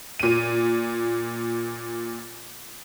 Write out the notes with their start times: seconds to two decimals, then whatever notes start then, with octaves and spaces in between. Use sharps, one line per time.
0.20 A#2 D#7